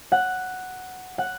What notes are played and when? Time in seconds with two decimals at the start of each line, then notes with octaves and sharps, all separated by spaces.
0.12 F#5
1.18 F#5